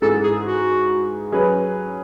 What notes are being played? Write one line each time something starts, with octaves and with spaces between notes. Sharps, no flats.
G#2 E3 G#3 A4
G#4
F#4
F#3 C#4 G#4 B4